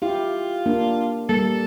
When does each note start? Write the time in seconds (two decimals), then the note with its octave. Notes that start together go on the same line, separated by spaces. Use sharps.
0.02 E4 F4 G4
0.66 A#3 D4
1.29 G3 A#3 A4